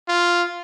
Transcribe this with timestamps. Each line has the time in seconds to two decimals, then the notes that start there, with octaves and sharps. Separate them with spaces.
0.08 F4